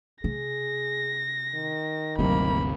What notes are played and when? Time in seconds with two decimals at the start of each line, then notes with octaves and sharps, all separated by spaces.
0.24 C3 G#4 A#6
1.55 D#3
2.19 G1 D2 C3 F#3 A#3 B5